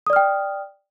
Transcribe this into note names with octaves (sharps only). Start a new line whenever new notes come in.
D5 G5 D#6 F6